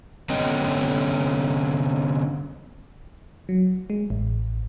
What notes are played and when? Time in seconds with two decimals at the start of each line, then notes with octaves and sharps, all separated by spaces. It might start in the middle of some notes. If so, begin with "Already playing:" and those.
0.29 D3 B3 C#4 D#5 G5
3.49 F#3
3.90 G#3
4.10 A1